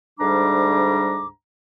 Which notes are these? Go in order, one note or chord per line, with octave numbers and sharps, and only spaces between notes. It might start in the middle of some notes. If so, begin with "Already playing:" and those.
D2 G#2 G3 D4 A#5 D6